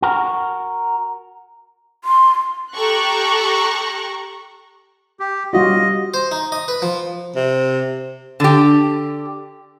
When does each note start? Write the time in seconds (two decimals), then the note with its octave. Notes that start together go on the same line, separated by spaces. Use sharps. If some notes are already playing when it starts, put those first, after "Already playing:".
0.02 F#4 A#4
2.04 C6
2.74 G4 A4 A#5 C#6 F#6
5.20 G4
5.53 G3 F4 F#4 D#5
6.14 C5
6.32 D#4
6.52 D#5
6.68 B4
6.82 F3
7.36 C3
8.40 D3 G4